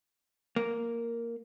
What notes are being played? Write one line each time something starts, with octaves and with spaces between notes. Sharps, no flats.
A#3